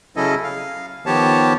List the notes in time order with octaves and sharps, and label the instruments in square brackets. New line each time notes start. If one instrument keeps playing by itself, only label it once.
[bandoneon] C#3 F#3 C#4 E4 A4 D#5
F5
D#3 F3 B3 G4 C#5 A5